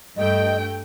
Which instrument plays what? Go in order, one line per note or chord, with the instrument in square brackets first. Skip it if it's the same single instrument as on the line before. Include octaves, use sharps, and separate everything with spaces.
[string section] G2 A3 G5 [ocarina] D#5